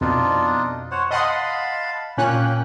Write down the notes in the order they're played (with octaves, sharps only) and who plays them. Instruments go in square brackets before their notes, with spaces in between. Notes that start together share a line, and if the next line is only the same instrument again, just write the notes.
[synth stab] F2 B2 [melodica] D4 D#4 F4
[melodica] C5 C#5 F#5
[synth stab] D#5 F#5 C6 [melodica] F5 A5 B5
[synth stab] A#2 C#4 F#6 [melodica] A#3 G5